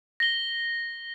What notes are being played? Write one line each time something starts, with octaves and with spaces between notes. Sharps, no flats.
A#6 G7